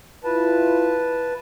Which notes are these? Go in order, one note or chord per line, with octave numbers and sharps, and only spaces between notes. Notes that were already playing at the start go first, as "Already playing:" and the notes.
E4 F4 B4 A5